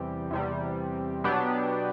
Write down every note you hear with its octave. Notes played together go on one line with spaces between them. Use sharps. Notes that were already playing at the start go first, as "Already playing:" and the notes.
Already playing: E2 C3 G3
E2 C3 G3
B2 F#3 B3 D4 G4